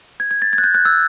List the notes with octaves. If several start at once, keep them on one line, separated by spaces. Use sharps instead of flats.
G#6
G#6
A6
G#6
F#6
G6
F#6
E6